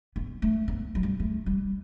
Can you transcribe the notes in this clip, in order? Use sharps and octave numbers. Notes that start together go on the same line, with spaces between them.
B3
A3
B3
F#3
G3
A3
G3